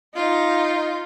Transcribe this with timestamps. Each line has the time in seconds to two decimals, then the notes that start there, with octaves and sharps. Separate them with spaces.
0.15 D#4 F4